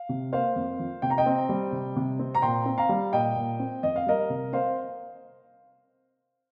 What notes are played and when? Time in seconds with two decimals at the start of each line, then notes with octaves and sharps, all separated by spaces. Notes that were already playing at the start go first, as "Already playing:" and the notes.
Already playing: F5
0.09 C3
0.32 A#3 C5 F5
0.56 F2
0.79 F3
1.02 C3 G5
1.10 A#5
1.18 D#5 G5
1.26 C4
1.49 G3
1.72 C3
1.96 C3
2.19 C4
2.35 A#5
2.42 A#2 G5 C6
2.66 C4
2.78 F5 A#5
2.89 G3
3.13 A#2 D#5 G5
3.36 A#2
3.60 C4
3.83 F2 D#5
3.96 F5
4.07 G3 A#4 D#5
4.30 C3
4.53 C4 C5 F5